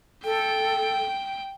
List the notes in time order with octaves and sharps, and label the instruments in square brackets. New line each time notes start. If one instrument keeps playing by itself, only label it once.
[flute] A4 [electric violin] G5